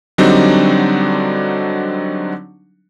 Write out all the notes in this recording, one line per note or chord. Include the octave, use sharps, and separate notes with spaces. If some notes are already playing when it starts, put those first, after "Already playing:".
D3 F#3 G3 C4 D4 D#4